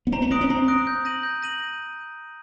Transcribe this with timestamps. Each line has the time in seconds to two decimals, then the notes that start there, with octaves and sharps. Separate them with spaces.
0.07 B3
0.12 C4 A#5
0.22 B3
0.31 C4 D#6 F#6 A#6 D7
0.41 C#4
0.50 C4 A#5
0.68 D#6 F#6 A#6 D7
0.87 G6
1.05 A#6 D#7 F#7
1.23 G6
1.42 A#6 D#7 F#7